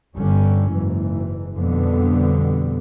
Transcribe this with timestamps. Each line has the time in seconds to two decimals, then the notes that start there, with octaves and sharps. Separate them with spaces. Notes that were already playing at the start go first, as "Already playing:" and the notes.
0.16 G1 D3 G3 C#4
0.71 F#1 G#2 E3
1.58 F2 B2 D3 G3 B3